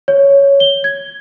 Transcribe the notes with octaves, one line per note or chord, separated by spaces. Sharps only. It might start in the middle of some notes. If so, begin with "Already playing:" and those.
C#5
G7
G#6